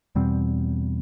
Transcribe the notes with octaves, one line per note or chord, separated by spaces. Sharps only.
E2 B2 G3 C4